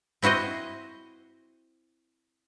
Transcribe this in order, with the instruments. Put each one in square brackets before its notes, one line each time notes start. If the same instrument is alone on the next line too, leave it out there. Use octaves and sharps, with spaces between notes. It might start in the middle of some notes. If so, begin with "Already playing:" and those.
[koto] C4 E4 F#4 C5 D#5